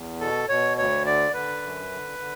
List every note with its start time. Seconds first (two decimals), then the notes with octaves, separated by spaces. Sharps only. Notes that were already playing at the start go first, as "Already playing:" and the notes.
Already playing: E2
0.21 B2 A4
0.49 B2 C#5
0.78 D2 C#5
1.05 D3 D5
1.34 D3 B4
1.62 F#2
1.92 D3
2.19 D3